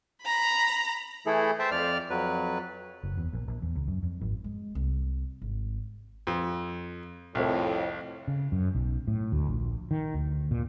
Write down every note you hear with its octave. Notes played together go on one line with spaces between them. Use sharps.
A#5 B5
E3 A3 E4 G#4 A4
C5 E5 G5 A5
F2 D5 F6
F2 F#3 B4
F#1
E2
A#1
A#1
E2
C#2
F#2
F2
G#1
G#3
C2
G#1
F2
C2 F2 A2
C#3
F#2
B1
A2
D2
A#1
D#3
D2
A#2